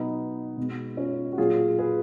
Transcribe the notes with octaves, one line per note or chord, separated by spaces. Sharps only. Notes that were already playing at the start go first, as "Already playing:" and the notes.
Already playing: B2 F#3 B3 D#4
B2 G#3
C#4 F4
F#4
A#2 F#3 F4 G#4
G#4 B4